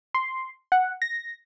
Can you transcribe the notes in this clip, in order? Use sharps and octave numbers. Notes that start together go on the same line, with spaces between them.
C6
F#5
A#6